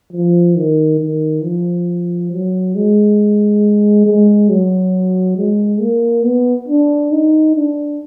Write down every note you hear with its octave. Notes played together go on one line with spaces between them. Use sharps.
F3
D#3
D#3
F3
F#3
G#3
G#3
F#3
G#3
A#3
B3
D4
D#4
D4